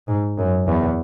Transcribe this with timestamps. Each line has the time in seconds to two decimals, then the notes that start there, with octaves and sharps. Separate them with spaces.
0.08 G#2
0.38 F#2
0.67 E2